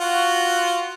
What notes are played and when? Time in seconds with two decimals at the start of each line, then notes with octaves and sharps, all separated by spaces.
0.01 F4 F#4 F#5